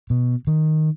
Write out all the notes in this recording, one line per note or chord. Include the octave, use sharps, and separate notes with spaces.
B2
D#3